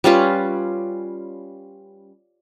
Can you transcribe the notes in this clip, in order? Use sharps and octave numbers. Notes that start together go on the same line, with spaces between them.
G3 C#4 F4 B4